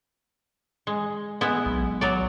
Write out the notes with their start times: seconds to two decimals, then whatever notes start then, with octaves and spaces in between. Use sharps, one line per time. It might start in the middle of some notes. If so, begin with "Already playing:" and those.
0.87 G#3
1.41 G#3 B3 E4
1.66 B1
2.01 F#3 D5